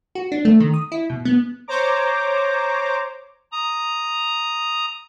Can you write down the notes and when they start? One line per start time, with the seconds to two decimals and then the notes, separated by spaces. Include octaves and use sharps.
0.15 F#4
0.32 D4
0.45 A3
0.60 D#3
0.74 D#6
0.92 E4
1.10 B2
1.25 B3
1.68 C5 C#5 A#5 D6
3.52 A#5 D#6